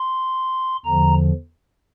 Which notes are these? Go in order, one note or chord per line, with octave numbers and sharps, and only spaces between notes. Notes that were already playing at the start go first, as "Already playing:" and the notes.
Already playing: C6
E2 D3 F3 A#5